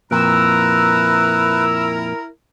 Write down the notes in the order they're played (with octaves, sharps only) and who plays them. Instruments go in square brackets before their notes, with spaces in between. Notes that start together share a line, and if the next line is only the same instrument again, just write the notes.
[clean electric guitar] F2 A#2 [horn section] E4 A#4 A#5 [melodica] B4 [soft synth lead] E6